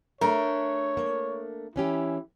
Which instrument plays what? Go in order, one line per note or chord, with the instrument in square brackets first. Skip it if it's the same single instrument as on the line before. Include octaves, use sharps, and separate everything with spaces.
[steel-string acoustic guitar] A3 D4 [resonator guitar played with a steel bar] A#4 [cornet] C#5
[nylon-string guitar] A#3
[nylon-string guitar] E3 C#4 G4 [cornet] E4